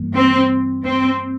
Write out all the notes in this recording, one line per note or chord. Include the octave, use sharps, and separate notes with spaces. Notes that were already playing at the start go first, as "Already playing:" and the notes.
Already playing: G2 E3 G3 A#3
C4
C4